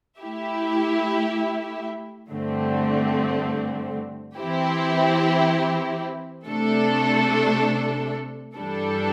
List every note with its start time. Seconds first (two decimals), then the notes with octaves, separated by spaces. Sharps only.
0.19 A3 E4 G4 E5
2.28 G2 D3 A3 C4
4.37 E3 C4 E4 G4
6.47 C3 A3 D4 A4
8.56 G2 E3 G3 D4 A4